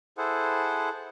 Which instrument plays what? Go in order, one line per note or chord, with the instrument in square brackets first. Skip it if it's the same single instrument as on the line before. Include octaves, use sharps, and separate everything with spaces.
[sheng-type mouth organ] E4 G#4 A4 C5 F#5